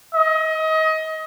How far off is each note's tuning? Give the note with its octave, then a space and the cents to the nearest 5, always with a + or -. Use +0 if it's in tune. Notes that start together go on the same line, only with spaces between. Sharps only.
D#5 +25